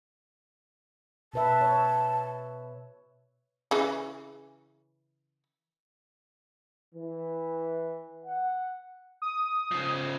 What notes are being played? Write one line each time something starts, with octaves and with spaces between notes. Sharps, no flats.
B2 B4 E5 A5
C#5
C#3 E3
E3
F#5
D#6
C#3 F3